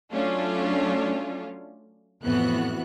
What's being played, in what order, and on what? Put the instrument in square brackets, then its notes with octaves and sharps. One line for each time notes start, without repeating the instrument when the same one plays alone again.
[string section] F#3 A3 C#4 D4 F4
F2 A2 E3 B3 F#4 F#6